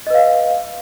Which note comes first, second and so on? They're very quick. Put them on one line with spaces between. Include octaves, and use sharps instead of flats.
D#5 B4 F5